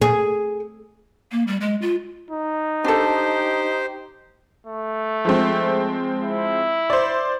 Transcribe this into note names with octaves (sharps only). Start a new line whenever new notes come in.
G#4
A#3
G3
G#3
F4
D#4
D4 G4 A4 C5
A3
F3 G#3 C4
E4
C5 D5